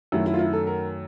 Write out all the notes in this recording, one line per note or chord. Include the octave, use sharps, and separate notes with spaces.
F#2 D#3 F#3 A3 E4
E4
F4
E4
A4
A#4